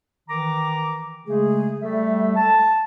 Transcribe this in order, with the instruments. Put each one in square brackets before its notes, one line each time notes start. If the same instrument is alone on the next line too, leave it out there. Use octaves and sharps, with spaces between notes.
[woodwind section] D#3 E3 A#5 D6
C#3 G#3 A3 G#4
G3 A3 A4 E5
A5